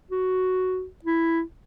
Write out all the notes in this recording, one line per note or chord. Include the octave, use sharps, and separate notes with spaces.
F#4
E4